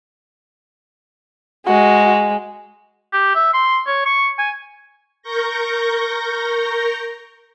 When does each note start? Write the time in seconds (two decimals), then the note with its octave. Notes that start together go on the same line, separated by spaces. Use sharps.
1.66 G#3 F#4
3.12 G4
3.35 E5
3.54 C6
3.87 C#5
4.05 C#6
4.38 G#5
5.22 A#4 C#6 G6 A#6